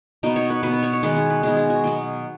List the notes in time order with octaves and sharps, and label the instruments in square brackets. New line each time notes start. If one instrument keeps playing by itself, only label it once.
[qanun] B2 B3 D#4
C#5
B4
B2 B3 B4
B4
C#5
C#5
D#3 G#3 B3 B4
G#4
B4
D#3 G#3 B3 G#4
G#4
F#4
B2 F#3 B3